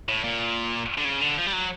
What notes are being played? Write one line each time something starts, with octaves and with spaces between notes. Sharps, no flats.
A2
A#2
D3
C#3
D3
F3
G3
F#3